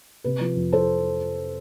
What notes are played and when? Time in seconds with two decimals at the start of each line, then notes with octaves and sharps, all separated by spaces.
0.24 C3 B4
0.41 F3
0.56 F2
0.72 A4 C5